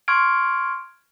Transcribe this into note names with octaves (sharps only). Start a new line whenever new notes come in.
C6 C#6 F6 G#6 D7